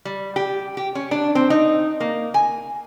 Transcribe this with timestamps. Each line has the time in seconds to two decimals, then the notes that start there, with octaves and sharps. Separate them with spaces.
0.05 G3
0.36 G4
0.77 G4
0.95 C#4
1.11 D4
1.35 C4
1.50 D#4
2.00 A#3
2.34 G#5